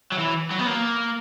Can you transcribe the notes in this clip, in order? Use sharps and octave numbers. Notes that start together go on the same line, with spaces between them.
F#3
E3
F#3
B3
A#3